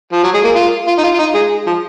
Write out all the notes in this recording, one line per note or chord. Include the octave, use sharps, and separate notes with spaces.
F3
F#3
G#3
A#3
F4
F4
D#4
F4
F4
D#4
G#3
F3